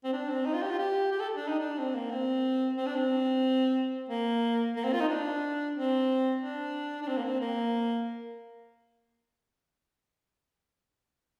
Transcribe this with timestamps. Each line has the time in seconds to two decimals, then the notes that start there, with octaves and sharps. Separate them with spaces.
0.04 C4
0.13 D4
0.29 C4
0.46 D#4
0.54 F4
0.62 G4
0.71 F4
0.79 G4
1.12 G4
1.20 A4
1.36 D4
1.48 D#4
1.59 D4
1.78 C4
1.95 A#3
2.11 C4
2.77 C4
2.86 D4
2.95 C4
4.09 A#3
4.76 A#3
4.84 C4
4.93 F4
5.00 D#4
5.09 D4
5.75 C4
6.41 D4
7.02 D4
7.07 C4
7.17 A#3
7.24 C4
7.40 A#3